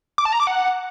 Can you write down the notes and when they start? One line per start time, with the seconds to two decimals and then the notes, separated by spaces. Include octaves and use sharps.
0.18 D6
0.25 A5
0.33 A#5
0.40 D6
0.47 F#5